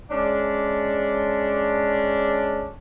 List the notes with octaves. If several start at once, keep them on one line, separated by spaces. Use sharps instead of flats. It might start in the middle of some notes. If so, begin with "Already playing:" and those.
G#3 C#4 D4